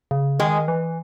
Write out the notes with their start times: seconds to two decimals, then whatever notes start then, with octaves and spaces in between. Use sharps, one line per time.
0.11 C#3
0.39 D#3 G#3
0.68 E3